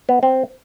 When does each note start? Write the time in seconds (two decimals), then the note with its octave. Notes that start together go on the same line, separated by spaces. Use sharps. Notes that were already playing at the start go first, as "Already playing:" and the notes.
0.09 B3
0.23 C4